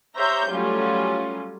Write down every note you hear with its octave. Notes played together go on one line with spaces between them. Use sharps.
G4 C5 C#5 E5 A#5 G6
F#3 G3 A3 C#4 F4